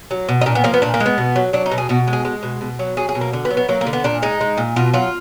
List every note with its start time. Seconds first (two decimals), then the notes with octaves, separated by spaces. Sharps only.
0.11 F#3
0.29 B2
0.41 D#4
0.46 A#2 D4
0.55 B3
0.64 F3 A#3
0.74 B3
0.82 A#2 D4
0.94 A#3
1.00 G#3
1.06 B3
1.18 B2
1.36 F#3
1.53 F#3 D4
1.66 D#4
1.71 B2
1.78 G#4
1.89 B2 F#4
2.07 G#3
2.13 G#4
2.25 G#3
2.43 B2
2.61 B2
2.79 F#3
2.97 F#3 G#4
3.09 G#4
3.15 B2
3.21 A#3
3.33 D3
3.45 B3
3.51 F#3
3.57 B3
3.68 F#3 A#3
3.81 A#3
3.86 D3
3.93 B3
4.04 A#2 D4
4.22 G#3 D#4
4.41 G#3
4.57 A#2
4.76 B2 F4
4.93 F#3 F4